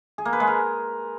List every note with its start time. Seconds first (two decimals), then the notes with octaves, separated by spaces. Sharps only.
0.18 G#4
0.25 A#3
0.33 B4
0.40 G#3
0.47 A#4